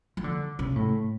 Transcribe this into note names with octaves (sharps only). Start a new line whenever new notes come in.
F3
D3
C#3
A2